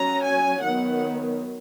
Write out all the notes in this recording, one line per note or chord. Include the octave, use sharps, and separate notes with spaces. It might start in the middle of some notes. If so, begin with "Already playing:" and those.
Already playing: F#3 C#4 A#5
G#5
D#3 F#3 B3 F#5